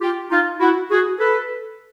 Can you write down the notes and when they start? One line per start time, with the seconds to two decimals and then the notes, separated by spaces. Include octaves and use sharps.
0.01 F4 G4
0.30 D#4 F4
0.60 E4 F#4
0.90 F#4 G#4
1.19 A4 B4